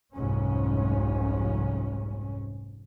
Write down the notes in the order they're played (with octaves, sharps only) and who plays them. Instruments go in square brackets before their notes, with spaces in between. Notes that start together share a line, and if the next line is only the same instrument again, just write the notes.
[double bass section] F1 C2 G#2 C#4